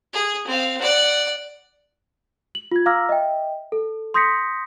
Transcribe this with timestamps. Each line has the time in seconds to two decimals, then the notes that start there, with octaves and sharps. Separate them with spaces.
0.13 G#4
0.47 C4 F5
0.81 D5 F#5
2.55 F#7
2.72 F4 G#6
2.86 F5 A#5 D6 E6 F6 A#6
3.09 D#5 E5 G5
3.72 A4
4.14 C6 D#6 G6 A#6 B6 C#7